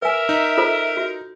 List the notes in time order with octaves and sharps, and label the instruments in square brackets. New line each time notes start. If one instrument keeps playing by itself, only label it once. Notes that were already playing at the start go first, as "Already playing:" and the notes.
[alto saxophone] A#4 [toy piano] B4 G#5 [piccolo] E5
[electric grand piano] D#4
[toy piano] F4 A4 C5
F#4